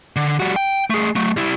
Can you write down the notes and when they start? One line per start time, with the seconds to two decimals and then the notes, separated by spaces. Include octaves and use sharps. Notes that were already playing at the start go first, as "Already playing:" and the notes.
0.16 D3
0.40 G3 F#4
0.56 G5
0.90 A3 G#4
1.16 F#3 A3
1.37 G3 E4